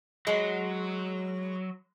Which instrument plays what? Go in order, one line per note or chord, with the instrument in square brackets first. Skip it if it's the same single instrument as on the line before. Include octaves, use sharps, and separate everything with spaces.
[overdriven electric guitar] F#3 [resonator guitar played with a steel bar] G#3